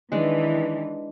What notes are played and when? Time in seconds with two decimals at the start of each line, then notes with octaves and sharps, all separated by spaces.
0.12 D#3 E3 G#3 D4